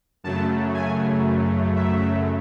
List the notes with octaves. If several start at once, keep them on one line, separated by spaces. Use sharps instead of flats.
F#2 C#3 F#3 A3 A5
G#5
E5